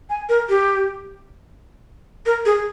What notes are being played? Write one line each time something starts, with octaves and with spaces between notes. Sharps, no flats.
G#5
A#4
G4
A#4
G#4